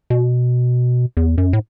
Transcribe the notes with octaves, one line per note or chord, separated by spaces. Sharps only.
B2
E2
F#2
A2